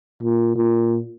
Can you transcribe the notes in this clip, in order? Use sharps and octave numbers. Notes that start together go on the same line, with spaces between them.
A#2
A#2